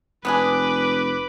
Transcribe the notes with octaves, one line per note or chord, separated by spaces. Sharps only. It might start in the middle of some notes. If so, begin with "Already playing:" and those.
F1 B3 D4 G#4 B4 D6